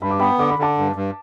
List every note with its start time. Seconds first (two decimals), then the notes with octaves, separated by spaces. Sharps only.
0.01 G2 B5
0.11 D6
0.20 B3 G5 B5
0.39 D3 D6
0.50 B5
0.59 D3 A5 D6
0.78 G2
0.96 G2